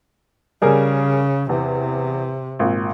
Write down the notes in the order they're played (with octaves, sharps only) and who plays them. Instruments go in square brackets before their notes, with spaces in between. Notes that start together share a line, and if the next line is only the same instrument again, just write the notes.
[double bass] C#3 [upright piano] G3 G#4 A#4
[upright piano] E2 [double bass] C3
[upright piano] G#1 A#2